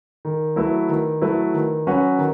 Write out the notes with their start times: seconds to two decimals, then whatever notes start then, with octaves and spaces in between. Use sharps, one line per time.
0.25 D#3
0.56 F#3 A3 E4 B4
0.89 D#3
1.22 F#3 A3 E4 B4
1.54 D#3
1.87 F#3 C#4 F#4 B4
2.19 D#3